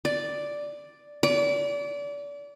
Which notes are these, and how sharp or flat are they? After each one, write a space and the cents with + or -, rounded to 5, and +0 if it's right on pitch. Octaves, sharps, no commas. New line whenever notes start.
D5 +0
D5 -30